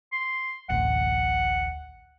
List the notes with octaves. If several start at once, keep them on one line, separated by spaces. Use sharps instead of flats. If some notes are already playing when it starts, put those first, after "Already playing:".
C6
D1 A1 F#5